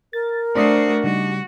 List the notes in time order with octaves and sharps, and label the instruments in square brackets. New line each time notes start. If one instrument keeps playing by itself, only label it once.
[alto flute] A#4 [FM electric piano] A6
[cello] A3 F#4 [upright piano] D4 [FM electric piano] C5 D#6 C7
[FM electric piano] C#3 G3 D#4 [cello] F#4